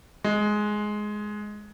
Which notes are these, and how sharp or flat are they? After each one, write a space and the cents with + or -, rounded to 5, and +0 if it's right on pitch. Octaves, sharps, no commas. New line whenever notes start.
G#3 +10